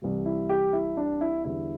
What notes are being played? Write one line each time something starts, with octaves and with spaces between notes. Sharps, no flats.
C2 C3 E3 G3
E4
G4
E4
D4
E4
E2 D3 G3 E4